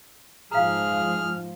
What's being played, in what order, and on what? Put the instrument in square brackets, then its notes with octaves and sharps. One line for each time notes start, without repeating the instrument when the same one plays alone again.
[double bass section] G#2 F3 [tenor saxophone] G#4 [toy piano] F5 A#5 [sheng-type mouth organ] F6